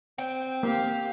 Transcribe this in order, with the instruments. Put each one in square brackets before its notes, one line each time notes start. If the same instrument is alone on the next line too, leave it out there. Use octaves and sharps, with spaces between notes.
[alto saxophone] C4 [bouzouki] G5
[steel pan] A#3 [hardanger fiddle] G4 F5